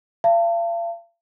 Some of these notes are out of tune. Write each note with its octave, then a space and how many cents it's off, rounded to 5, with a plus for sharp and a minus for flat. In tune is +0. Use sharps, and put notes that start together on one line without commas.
F5 -45 A5 +30